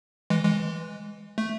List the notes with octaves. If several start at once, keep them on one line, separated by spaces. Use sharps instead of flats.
E3 G#3
E3 G#3
A3